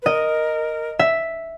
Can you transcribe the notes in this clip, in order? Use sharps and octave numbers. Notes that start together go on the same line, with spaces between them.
B4
A#4 D#5
E5